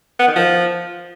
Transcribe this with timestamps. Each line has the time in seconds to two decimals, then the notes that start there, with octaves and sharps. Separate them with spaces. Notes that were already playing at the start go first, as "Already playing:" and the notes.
0.19 B3
0.28 D#3
0.36 F3